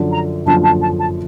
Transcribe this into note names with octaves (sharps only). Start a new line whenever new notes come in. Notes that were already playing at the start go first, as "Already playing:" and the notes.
Already playing: F#2 D3 F3
A#5
F#2 D3 F3 A5
A5
A5
A5